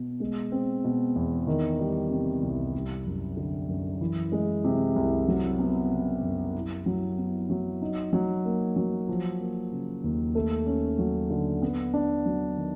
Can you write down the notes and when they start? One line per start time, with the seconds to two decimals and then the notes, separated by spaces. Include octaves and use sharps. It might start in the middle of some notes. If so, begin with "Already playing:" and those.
Already playing: B2
0.20 G#3
0.52 C4
0.84 B2
1.16 E2
1.47 D#3
1.79 G3
2.10 C3
2.43 C2
2.74 G3
3.06 F#2
3.37 D3
3.69 F#2
4.01 E3
4.32 G#3
4.64 C3
4.96 C2
5.28 F#3
5.59 B3
5.91 C#3
6.22 F#2
6.55 E4
6.86 F#3
7.18 B3
7.50 F#3
7.82 D#4
8.13 F#3
8.45 A#3
8.76 F#3
9.09 F3
9.40 A#3
9.71 C#3
10.04 D#2
10.35 A3
10.66 C#4
10.99 F#3
11.30 D3
11.62 B3
11.94 D4
12.26 F#3
12.57 D#3